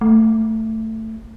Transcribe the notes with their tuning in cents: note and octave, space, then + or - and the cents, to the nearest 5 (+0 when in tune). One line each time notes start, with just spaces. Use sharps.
A3 +15